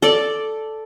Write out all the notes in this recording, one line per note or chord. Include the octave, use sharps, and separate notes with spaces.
A4 D5